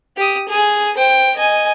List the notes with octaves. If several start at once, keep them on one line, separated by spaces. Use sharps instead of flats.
G4 D#6
G#4
C5 G5
D#5 G#5